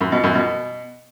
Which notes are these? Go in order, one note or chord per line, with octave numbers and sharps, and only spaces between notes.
F#2
B2
F#2
B2